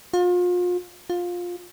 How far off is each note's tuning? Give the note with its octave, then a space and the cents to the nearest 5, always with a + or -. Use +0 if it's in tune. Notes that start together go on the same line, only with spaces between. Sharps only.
F4 +35
F4 +15